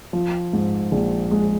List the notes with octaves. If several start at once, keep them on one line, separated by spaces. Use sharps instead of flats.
F3
G#2
A#1
G#3